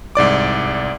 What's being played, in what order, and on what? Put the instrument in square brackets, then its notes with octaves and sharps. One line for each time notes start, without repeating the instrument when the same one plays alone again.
[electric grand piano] C2 G#2 D5 D6